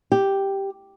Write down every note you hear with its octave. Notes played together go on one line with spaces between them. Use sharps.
G4